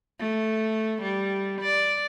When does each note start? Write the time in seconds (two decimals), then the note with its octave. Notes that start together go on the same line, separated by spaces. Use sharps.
0.19 A3
1.02 G3
1.61 D5